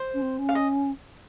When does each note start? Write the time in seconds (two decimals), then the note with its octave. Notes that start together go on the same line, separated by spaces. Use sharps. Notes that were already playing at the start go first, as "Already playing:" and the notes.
Already playing: C5
0.14 C#4
0.22 C4
0.39 C#4
0.49 F5
0.55 D#5